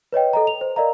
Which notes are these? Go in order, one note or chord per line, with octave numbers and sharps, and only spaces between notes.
B4 C#5 D#5 G5
A4 D#5 A#5
F7
C5
A#4 D5 D#5 F5 A#5